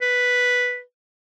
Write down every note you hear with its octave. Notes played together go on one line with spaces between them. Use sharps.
B4